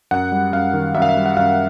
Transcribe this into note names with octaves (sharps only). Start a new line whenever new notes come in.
F#2 F#5
G3
F#2 F5
D#3
F#2 E5
F5
E5
G3
F#5
F#2 F5